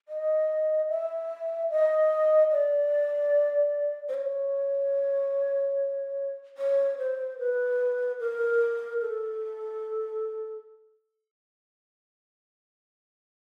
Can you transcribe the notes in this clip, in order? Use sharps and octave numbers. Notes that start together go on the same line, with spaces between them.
D#5
E5
D#5
D5
C5
C#5
C#5
C5
B4
A#4
A4